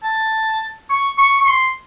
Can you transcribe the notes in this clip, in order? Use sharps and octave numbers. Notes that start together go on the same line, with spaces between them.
A5
C#6
C#6
C#6
C6